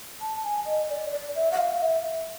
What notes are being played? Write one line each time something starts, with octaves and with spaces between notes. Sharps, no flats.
A5
G#5
D#5
D5
D5
E5
F#5
F5
E5